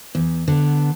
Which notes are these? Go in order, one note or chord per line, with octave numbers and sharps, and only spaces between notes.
E2
D3 B3